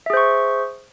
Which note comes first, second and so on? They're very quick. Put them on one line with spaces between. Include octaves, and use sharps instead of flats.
E5 G#4 C5 C#6